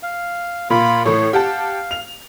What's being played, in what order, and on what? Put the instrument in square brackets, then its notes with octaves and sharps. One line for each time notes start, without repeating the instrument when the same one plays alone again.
[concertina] F5
[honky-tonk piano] A#2 [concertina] F4 B5
[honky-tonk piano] A2 E3 [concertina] C#5
[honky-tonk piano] G4 F#5 A5 [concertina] F5
[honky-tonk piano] F7